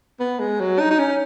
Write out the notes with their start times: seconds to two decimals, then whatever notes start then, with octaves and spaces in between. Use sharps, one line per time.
0.20 B3
0.40 G#3
0.60 F#3
0.79 D#4
0.90 D#4
0.99 C#4